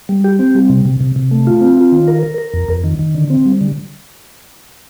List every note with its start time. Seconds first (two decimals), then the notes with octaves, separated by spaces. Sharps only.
0.09 G3
0.24 G4
0.39 C4
0.55 G3
0.70 C3
0.86 C3
1.00 C3
1.16 C3
1.31 A3
1.47 F4
1.61 C4
1.77 F4
1.92 D#3
2.08 A#4
2.23 A#4
2.38 A#4
2.54 F2
2.68 F2
2.84 D#3
2.99 D#3
3.15 D3
3.30 C4
3.46 G3
3.61 D3